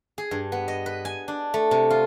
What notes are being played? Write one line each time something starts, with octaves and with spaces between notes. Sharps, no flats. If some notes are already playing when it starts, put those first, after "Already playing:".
G#4
G2
B3
D#5
B4
G#5
D4
A3
C3
F4